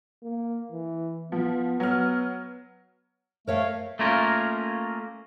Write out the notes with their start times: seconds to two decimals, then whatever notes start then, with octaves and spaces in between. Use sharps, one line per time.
0.23 A#3
0.72 E3
1.32 F3 B3
1.80 F#3 B3 F6
3.47 A3 A#4 C#5 F5
3.99 A3 A#3 C#4 F4 A#4